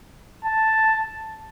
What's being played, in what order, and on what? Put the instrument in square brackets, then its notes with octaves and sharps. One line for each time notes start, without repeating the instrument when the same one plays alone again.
[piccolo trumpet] A5